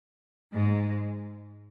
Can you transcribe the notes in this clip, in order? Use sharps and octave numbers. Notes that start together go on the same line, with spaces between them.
G#2 G#3